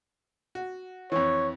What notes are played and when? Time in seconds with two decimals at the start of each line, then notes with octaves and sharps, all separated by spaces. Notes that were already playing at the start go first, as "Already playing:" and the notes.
0.55 F#4
1.12 F2 E3 C#5